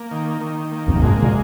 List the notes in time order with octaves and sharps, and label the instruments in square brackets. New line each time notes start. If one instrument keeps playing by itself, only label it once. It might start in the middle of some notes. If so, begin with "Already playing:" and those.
Already playing: [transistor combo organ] A#3
D#3
D#3
A#3
[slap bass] F2
F#2
[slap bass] F2 G#2 [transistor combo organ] G#3
[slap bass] A#2